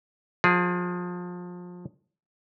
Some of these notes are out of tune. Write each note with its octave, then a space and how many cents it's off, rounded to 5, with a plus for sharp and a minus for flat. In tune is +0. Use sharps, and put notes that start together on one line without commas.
F3 +30 G#4 +0